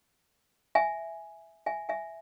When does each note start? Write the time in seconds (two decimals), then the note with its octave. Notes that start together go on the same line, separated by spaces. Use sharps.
0.75 E5 G#5
1.66 E5 G#5
1.89 E5 G#5